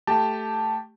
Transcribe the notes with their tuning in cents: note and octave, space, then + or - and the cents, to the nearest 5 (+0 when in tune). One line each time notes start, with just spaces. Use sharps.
A3 +0 G4 +0 A5 +0